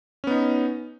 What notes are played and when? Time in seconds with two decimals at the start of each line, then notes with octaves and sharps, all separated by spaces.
0.24 C#4
0.27 B3
0.31 D#4